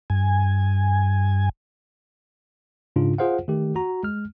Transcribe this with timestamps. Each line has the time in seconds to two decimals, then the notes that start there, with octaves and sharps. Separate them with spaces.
0.10 G2 G#5
2.96 G#2 C#3 D4 F4
3.18 F4 G#4 C5 F5 F#5
3.48 D#3 A3 G4
3.76 F#4 A#5
4.03 G#3 F6